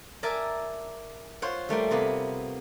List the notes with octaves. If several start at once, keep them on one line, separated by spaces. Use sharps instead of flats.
A#4 D5 E5 G#5 A5
F4 C5 C#5 F#5
G3 A3 A#3 G5
C3 A#3 B3